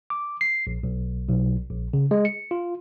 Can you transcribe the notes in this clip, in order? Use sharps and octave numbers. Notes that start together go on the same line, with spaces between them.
D6
C7
A#1
B1
B1
A#1
C#3
G#3
C#7
F4